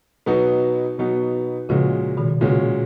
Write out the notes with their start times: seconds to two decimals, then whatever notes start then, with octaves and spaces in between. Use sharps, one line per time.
0.26 B2 F#3 B3 D#4 F#4
0.98 B2 F#3 B3 D#4 F#4
1.69 A#2 C#3 F3 G#3 C#4 F#4
2.17 B2 D#3
2.41 A#2 C#3 G#3 C#4 F#4